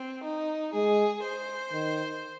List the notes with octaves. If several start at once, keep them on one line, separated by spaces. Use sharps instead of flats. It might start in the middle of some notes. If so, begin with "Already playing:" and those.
Already playing: C4
D#4
G#3 G#4
C5
D#3